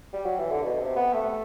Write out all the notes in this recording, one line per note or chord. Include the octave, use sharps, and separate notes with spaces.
G3
F#3
E3
D3
B2
C3
B3
A3